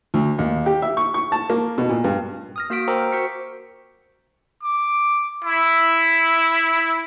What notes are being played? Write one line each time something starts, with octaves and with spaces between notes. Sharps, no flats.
D2
D#2
G4
E5
C#6
C#6
A5
A#3
B2
A#2
G2
D#6 F6 A#6
A#3 F#4 F5 B6 D7
A#4 C5 G5 A#5 D6 E6
F#4 C#6 B6 C#7
D6
E4